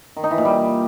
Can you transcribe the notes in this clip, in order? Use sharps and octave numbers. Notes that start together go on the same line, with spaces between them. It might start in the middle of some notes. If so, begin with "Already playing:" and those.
D#3
D#4
E3
A#2
G3